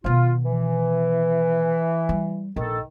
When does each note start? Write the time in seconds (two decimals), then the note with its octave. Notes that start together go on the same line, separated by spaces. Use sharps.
0.04 B2 D#3 F4
0.46 E3
2.09 G3
2.56 A#1 D#3 A4